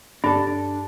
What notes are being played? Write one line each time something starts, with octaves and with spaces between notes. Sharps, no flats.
G2 D4 A4